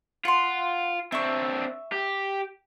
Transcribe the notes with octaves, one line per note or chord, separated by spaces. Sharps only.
F4 F#5 C6
C4 D4 E5 C#6
G4